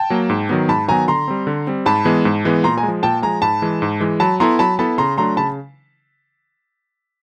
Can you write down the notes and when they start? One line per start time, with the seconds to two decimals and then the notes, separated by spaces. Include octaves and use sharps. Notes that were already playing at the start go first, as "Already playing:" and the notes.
Already playing: G5 A5
0.10 F#3 A#3
0.30 G#2
0.49 D#3 F#3 B3
0.68 G#2 A5 B5
0.88 D#3 F#3 B3 G#5 A#5
1.08 D3 A#5 C6
1.28 G3 C4
1.47 D3
1.67 G3 C4
1.86 G#2 A5 B5
2.05 E3 G#3 B3
2.25 G#2
2.45 E3 G#3 B3
2.64 A#2 A#5 C6
2.77 G#5 A#5
2.83 G#3
2.88 F3
3.03 A#2 G5 A5
3.23 F3 G#3 G#5 A#5
3.42 G#2 A5 B5
3.62 E3 G#3
3.82 G#2
4.00 E3 G#3
4.20 F#3 A5 B5
4.40 B3 E4 A4 A#5 C6
4.59 F#3 A5 B5
4.79 B3 E4 A4 A5 B5
4.98 C#3 A#5 C6
5.18 F#3 A3 D4 A#5 C6
5.37 C#3 A5 B5